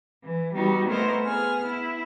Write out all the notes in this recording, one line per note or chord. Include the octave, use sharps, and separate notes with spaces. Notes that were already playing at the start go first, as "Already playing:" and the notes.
E3
G3 B3 D#4 F#4
A3 B3 E4 A#4 C5 D#5
B3 G#4 F6
E4